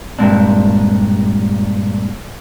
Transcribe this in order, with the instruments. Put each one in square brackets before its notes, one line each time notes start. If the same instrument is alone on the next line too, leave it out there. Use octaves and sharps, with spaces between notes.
[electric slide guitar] G2 A#2 C#3 G#3 C4 D4